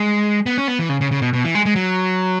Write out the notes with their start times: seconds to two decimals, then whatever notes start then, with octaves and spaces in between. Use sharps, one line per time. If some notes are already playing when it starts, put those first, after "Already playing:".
Already playing: G#3
0.46 B3
0.58 C#4
0.68 B3
0.79 E3
0.89 C#3
1.01 C#3
1.11 C#3
1.22 B2
1.33 B2
1.44 E3
1.55 G#3
1.66 G#3
1.76 F#3